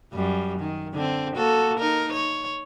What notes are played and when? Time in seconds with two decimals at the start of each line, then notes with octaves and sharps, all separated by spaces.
0.14 F#2 G3
0.60 D#3
0.94 D3 C4
1.36 A#3 F#4 A4
1.79 D#4 A#4
2.13 C#5